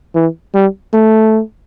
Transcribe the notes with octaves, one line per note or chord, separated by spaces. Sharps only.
E3
G3
A3